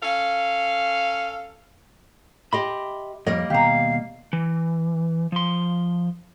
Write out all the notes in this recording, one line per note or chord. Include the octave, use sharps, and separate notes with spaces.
C#4 A4 F5
G4 D#5 E5 B5 C6
F2 G3 A#3 C#5 D#5
D#2 B2 G4 F5 A#5
E3
F3 C6